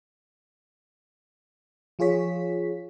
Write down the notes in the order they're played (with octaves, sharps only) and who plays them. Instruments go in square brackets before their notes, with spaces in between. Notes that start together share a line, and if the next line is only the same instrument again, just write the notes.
[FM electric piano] F3 F4 G#4 C#5 B6